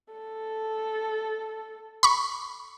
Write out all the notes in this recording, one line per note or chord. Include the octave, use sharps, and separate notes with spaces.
A4
B5 C#6